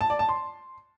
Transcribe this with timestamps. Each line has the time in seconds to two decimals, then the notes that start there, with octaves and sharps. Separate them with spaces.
0.01 A5
0.10 D5
0.19 A5
0.29 C6